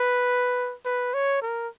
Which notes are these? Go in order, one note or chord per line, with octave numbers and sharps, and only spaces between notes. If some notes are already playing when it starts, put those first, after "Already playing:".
Already playing: B4
B4
C#5
A#4